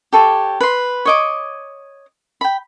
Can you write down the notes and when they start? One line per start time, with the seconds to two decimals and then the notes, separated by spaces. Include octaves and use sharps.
0.13 G4 A4 C#5
0.61 B4 C6
1.05 C#5 D#5 D6
2.41 G5 B5